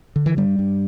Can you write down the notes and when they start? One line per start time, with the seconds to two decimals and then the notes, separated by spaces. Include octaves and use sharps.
0.16 D3
0.26 E3
0.37 G2 G3
0.59 G2